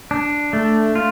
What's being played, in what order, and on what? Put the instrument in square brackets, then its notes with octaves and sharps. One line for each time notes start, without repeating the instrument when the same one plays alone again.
[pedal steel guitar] D4
A3
F4